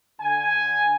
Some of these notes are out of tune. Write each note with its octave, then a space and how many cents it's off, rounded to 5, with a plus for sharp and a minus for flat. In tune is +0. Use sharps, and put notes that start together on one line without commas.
D3 +0 G#5 +0